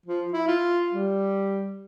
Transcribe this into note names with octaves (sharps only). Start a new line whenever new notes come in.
F3
E4
F4
G3